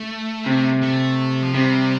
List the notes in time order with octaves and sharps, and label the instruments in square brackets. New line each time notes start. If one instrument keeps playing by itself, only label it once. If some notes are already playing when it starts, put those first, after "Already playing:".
Already playing: [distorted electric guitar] A3
[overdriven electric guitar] C3
[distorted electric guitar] A3
F3
[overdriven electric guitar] C3 [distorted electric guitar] G3